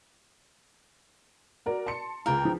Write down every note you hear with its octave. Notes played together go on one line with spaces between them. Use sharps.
F#4 A#4 D5
A5 C6 C#7
C#2 F4 A#4 G5
F3